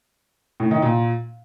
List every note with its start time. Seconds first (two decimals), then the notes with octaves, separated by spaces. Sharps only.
0.60 A2
0.71 D#3
0.82 A#2